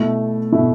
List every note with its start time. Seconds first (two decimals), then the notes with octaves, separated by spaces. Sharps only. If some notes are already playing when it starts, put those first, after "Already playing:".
Already playing: B2 A3 E4
0.52 B2 A3 E4